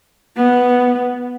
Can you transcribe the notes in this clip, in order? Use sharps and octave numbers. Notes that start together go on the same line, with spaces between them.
B3